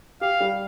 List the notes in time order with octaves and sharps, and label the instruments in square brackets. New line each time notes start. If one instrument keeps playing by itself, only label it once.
[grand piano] G4 [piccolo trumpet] F5
[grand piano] G3